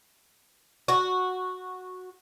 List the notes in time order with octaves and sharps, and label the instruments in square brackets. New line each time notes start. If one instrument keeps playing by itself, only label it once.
[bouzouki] F#4